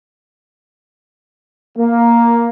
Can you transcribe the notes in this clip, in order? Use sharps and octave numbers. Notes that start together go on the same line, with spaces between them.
A#3